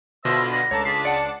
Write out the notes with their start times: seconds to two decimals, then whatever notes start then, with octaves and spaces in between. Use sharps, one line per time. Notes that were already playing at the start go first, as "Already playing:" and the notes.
0.25 B2 D3 F4 C5 E5 B5 E6 A#6
0.52 B4 F#5 A#6
0.71 C#2 A3 D4 C#5 A5 A#5
0.85 F4 G#4 B6 C7
1.05 D5 F#5 C#7